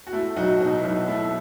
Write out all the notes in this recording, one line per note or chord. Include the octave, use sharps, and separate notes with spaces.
F#4
A3 E4
B1 D#4 F#4
B2 D#4
E4
B1 D#4
A3 E4